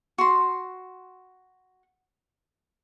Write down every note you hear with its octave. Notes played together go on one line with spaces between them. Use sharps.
F#4 C6